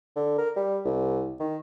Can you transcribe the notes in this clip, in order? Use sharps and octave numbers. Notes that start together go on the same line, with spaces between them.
D3
A#4
G3
C2
D#3